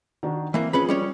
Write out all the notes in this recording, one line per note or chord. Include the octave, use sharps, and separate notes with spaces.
D#3 D4 F#4
E3 A#3 C4
F3 C#4 G#4 B4 B5
G3 C#4 C#5